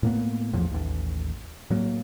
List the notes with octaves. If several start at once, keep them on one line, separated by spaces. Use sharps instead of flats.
A2 A#3 B3
A1 E2 F3
A1 D#2
A2 F#3 A#3